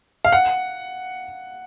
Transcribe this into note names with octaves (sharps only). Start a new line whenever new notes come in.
F5
F#5